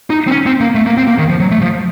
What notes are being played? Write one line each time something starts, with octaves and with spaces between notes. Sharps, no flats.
D#4
C4
C#4
C4
A#3
A3
A#3
C4
A#3
D#3
F3
F#3
A3
F3